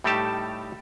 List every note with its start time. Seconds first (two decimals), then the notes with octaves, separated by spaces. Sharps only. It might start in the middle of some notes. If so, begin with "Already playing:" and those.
0.04 A2 G3 A3 D#4 G4 A5